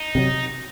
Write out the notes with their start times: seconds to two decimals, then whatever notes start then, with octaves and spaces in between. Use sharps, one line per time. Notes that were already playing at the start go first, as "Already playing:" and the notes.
Already playing: D#4
0.15 C3 D#3 F#3